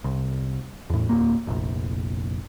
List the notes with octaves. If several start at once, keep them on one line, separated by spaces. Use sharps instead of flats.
C2
E2 A2
D1 A#3
F1 A#1